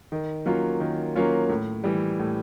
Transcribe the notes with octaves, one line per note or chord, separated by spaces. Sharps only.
D#3
F#3 A#3 C#4 F4
D#3
F#3 A#3 C#4 F4
A2
E3 G3
A2